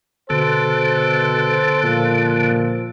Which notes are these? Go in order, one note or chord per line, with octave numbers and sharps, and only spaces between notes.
B2 D3 A4 C5
A#2 F3